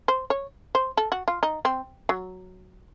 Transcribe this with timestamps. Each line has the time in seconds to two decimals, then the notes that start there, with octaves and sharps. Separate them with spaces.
0.08 C5
0.30 C#5
0.75 C5
0.97 A4
1.12 F#4
1.28 F4
1.43 D#4
1.65 C4
2.09 F#3